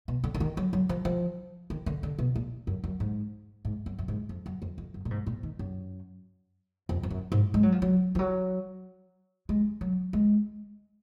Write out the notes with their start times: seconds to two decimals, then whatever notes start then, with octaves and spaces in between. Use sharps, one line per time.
0.08 B2
0.24 D3
0.34 D3
0.40 D#3
0.57 F#3
0.73 F#3
0.89 F3
1.05 F3
1.70 D#3
1.86 D3
2.03 D3
2.19 B2
2.36 A#2
2.67 F#2
2.84 F#2
3.00 G#2
3.65 G#2
3.86 F#2
3.99 F#2
4.08 G#2
4.29 F2
4.46 F#2
4.62 F2
4.78 F2
4.94 F#2
5.05 A#2
5.11 G#2
5.27 A#2
5.43 D#3
5.59 F#2
6.89 F2
7.03 F2
7.10 F#2
7.32 G#2
7.54 G#3
7.63 F#3
7.72 F3
7.82 F#3
8.15 F3
8.19 F#3
9.49 G#3
9.81 F#3
10.13 G#3